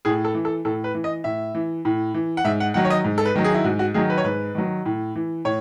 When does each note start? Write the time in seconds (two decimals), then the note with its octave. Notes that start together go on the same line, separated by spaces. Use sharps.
0.05 A2 G#4
0.25 A4
0.35 E3
0.45 A4
0.65 A2 A4
0.84 B4
0.95 E3
1.04 D#5
1.24 A2 E5
1.55 E3
1.85 A2
2.14 E3
2.37 F#5
2.44 G#2 E5
2.60 F#5
2.74 D#3 F#3 F#5
2.85 C#5
2.90 D#5
3.04 G#2
3.18 A4
3.25 B4
3.35 D#3 F#3
3.44 G#4
3.54 E4
3.64 G#2 F#4
3.79 F#4
3.94 D#3 F#3 G#4
4.10 B4
4.18 C#5
4.24 G#2 B4
4.55 D#3 F#3
4.85 A2
5.16 E3
5.45 A2 C#5